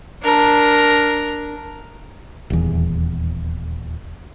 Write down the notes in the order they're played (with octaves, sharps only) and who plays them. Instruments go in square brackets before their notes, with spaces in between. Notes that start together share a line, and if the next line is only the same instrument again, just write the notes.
[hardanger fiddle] D4 A#4
[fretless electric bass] D#1 E2